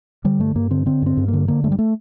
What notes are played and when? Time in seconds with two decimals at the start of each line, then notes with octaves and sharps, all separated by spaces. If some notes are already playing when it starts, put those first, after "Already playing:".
0.24 D3 G3
0.39 G2 A3
0.56 G2 A#3
0.70 D3 C4
0.86 D3 C4
1.02 G2 C4
1.17 G2
1.28 A#3
1.33 D3
1.48 D3 A#3
1.64 G2 A3
1.72 G3
1.79 A3